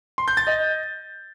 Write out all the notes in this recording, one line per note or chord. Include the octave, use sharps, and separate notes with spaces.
C6
G6
A6
D#5